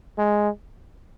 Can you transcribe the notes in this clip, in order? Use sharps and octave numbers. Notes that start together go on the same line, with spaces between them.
G#3